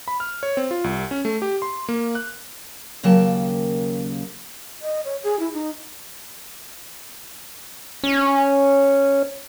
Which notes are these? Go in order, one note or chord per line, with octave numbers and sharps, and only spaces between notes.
B5
F6
C#5
C4
F4
C2
C#4
A3
G4
C6
A#3
F#6
D#2 C#3 F#3 A#3 G5 A5
D#5
C#5
G#4
E4
D#4
C#4